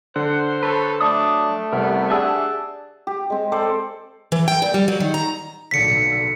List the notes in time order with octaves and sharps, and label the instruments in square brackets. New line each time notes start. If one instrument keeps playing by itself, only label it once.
[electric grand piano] D3 [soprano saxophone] C5 [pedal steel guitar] F#5
[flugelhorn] A4 [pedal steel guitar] B4 C#5 B5
[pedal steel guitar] F#3 D6 D#6 [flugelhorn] A3 [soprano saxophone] D4
[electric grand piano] C2 C3 [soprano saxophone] B3 [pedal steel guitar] A#4
[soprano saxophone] D4 [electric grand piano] G4 G#4 F#5 [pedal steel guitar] E5 G#5 E6
[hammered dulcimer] G4
G#3 C4
A4 C5 D5 G5
[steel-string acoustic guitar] E3
G5
A#2
G3
F#3
D#3
A#5
[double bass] B1 D3 [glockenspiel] B6 C#7